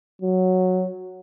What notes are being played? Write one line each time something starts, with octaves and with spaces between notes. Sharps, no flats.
F#3